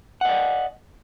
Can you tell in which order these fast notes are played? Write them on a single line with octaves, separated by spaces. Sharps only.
F#5 D#5 D5